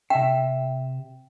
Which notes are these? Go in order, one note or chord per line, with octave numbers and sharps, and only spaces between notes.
C3 E5 G5